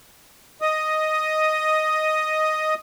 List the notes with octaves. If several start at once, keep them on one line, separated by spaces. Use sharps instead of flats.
D#5 D#6